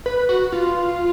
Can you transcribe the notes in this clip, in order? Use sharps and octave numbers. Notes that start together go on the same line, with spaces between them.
B4
F#4
F4